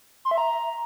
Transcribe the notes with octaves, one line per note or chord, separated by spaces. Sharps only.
C6
E5
A#5